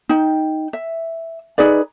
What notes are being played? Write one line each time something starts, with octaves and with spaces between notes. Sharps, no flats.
D#4 G5
E5
D#4 G#4 B4 D5